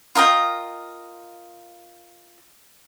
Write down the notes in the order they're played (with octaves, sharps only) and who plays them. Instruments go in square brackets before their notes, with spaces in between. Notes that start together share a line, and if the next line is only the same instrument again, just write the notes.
[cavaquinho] F4 A#4 D#5 G5